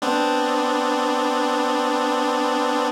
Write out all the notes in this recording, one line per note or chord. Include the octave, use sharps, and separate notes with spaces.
B3 C4 D4